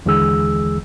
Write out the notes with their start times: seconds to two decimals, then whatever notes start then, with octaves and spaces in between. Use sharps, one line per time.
0.06 D#2 D3 E3 G#3 G#4 E6